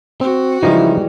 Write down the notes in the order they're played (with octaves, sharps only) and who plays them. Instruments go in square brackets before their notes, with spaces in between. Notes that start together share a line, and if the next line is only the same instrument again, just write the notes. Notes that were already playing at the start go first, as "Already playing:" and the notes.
[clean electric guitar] C4 [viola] F#4
[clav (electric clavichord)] C#3 F3 D#4 [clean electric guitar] E3 G3 G#3 [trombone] E4